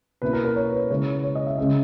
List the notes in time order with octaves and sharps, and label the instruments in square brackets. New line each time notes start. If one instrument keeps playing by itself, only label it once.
[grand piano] B2 A#3 E4 B4
A#4
A#4
C#5
B4
C#3 G#3 C#4 E4 C#5
C#5
D#5
E5
C#3 G#3 C#4 E5